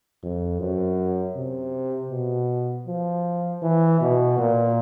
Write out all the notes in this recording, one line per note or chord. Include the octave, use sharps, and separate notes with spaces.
F2
F#2
C3
B2
F3
E3
B2
A#2